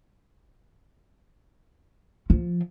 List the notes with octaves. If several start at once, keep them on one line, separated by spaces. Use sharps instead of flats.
F3